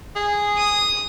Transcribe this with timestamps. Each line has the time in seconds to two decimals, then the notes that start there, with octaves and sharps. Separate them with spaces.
0.16 G#4
0.56 D#6